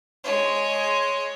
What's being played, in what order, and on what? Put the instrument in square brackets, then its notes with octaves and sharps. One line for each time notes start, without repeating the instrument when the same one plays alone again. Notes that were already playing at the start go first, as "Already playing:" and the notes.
[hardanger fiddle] G#3 C#5